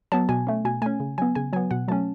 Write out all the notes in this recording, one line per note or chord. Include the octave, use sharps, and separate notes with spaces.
F#3 B3 A5
B2 G#5
A3 C#4
B2 G#5
A3 C#4 G#5
C#3
F#3 B3 G#5
C#3 G#5
F#3 B3 G#5
B2 F#5
F#3 A3 C#4 A5